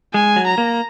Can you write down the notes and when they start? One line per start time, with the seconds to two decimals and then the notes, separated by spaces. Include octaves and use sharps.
0.14 G#3 G#5
0.36 F#3
0.47 A#5
0.58 A#3